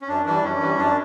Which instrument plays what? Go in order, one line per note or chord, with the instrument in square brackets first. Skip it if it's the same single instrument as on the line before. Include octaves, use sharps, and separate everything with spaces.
[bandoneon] C#4
F#2 D4
E3 G3 D4
F#2 C#4
E3 G3
F#2 D4